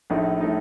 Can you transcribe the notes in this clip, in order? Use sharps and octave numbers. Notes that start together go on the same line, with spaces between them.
A#1 A2 A3 D#4
A2 A3 D#4